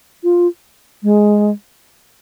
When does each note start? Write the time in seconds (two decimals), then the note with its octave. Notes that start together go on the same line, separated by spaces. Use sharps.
0.24 F4
1.03 G#3